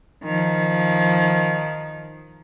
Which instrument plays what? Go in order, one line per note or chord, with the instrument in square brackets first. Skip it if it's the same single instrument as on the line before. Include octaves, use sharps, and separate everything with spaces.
[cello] D#3 F3